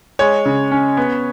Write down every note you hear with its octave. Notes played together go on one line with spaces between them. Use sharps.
G#3 C#5
C#3
C#4
B3